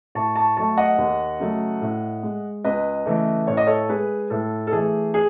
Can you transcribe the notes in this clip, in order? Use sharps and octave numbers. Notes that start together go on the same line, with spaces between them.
A2 A5 C#6
A5 C#6
F#3 A3 A5 C#6
D#5 F#5
D#2
C#3 F#3 A3
A2
G#3
C#2 B4 D#5
C#3 E3 A3
A2 C#5
D#5
A4 C#5
G#3 G#4 B4
A2 A4
A4
E3 A3 G#4
G#4